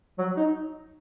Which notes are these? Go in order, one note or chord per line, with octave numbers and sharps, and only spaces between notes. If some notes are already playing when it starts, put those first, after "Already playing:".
F#3
D#4